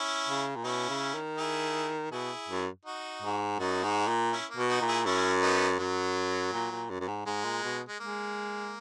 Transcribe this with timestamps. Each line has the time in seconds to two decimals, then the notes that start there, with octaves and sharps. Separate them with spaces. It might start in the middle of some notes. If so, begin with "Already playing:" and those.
Already playing: C#4 E4
0.28 C#3
0.56 A#2
0.64 B2 C#4 E4
0.89 C#3
1.14 D#3
1.38 E4 G#4
2.12 B2 E4 G#4
2.49 F#2
2.85 D#4 F#4
3.22 G#2
3.59 F#2 D#4 F#4
3.83 G#2
4.08 A#2
4.32 C#4 E4
4.50 A#3
4.57 B2
4.69 D#4 F#4
4.81 A#2
4.88 E4 G#4
5.06 F#2 C#4 E4
5.42 B3 D#4
5.79 F#2 F#3
6.53 A#2
6.71 A#2
6.90 F#2
7.00 F#2
7.08 G#2
7.26 G#2 G#3
7.45 A#2
7.63 B2
7.88 G#3
8.00 G#3 A#3